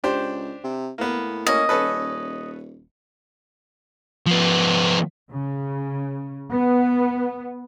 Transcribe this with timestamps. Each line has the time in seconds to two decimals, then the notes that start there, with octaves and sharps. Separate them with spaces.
0.04 C#2 D4 G4 C5
0.64 C3
0.98 A2 A#3 B3
1.47 A#3 C#4 D#5
1.69 D#1 C#4 A4 B4
4.26 F3 B3
5.32 C#3
6.52 B3